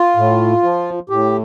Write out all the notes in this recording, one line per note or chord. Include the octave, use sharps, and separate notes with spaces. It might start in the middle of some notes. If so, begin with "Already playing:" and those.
Already playing: F4
A2
F3
A2 G4